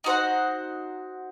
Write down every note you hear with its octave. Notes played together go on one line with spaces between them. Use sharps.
D#4 F#4 C5 F#5